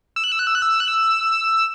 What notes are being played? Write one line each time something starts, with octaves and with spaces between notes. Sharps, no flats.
E6
F#6
E6
F#6
E6
F#6
E6
F#6
E6